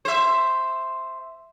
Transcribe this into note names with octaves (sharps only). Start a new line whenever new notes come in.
C5 E5